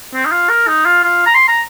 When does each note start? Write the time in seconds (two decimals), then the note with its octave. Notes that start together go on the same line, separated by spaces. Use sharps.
0.14 C4
0.26 D#4
0.32 F4
0.50 A#4
0.68 D#4
0.85 F4
1.04 F4
1.27 A#5
1.35 C6
1.48 A#5